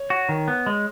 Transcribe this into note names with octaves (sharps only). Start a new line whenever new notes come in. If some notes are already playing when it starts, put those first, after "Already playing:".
Already playing: C#5
F#4
D#3
B3
G#3